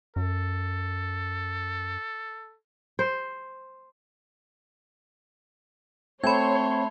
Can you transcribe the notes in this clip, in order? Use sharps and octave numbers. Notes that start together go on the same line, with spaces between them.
F#2 A4
C5
A3 C4 C#5 B5 C6 G#6